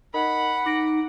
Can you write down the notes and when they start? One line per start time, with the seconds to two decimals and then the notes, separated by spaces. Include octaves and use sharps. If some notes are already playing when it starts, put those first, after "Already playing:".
0.14 D#4 A#4 D#5 F#5 B5
0.66 D#4 D6 A#6 D7